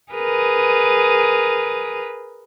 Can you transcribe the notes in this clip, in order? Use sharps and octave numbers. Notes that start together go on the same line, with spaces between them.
G#4 A#4 B4